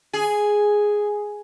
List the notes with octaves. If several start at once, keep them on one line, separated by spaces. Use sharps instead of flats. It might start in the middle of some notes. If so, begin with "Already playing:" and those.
G#4